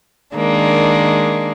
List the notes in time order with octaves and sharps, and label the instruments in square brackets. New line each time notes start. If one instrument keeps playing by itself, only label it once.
[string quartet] D#3 G#3 A#3 D4